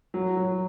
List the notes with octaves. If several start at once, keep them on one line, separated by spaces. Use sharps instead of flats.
F#3
F#3